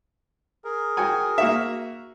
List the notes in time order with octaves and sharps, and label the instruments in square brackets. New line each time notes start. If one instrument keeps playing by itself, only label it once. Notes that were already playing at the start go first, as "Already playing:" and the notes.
[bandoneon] G#4 A#4
[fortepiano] F#4 G5 G#5
A#3 F#4 E5